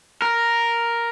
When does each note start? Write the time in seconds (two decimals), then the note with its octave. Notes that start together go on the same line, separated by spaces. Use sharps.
0.22 A#4